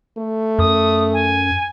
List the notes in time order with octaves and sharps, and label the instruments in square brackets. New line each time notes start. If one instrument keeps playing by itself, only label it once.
[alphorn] A3
[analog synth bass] F#2 [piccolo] D#6
[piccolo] G#5